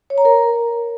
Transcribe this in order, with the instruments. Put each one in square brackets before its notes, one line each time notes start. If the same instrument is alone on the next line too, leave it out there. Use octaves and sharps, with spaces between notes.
[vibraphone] C#5
A#5
A#4